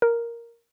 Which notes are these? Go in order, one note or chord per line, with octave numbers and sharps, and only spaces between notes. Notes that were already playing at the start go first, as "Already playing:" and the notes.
A#4